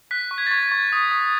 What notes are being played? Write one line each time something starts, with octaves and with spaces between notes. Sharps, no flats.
F#6 B6
C#6
G#6
A6
C#6 G#6
C#6
D#6
D#6